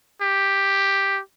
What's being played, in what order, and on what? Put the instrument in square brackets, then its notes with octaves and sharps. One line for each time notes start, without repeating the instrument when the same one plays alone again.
[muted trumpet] G4